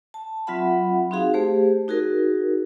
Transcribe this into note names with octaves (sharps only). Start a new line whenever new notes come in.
A5
F#3 C4 F4 E5 F#5 B5
C4 D#4 F#4 G#4 F5
A3 G4 G#4 C5
D#4 F#4 G#4 A#4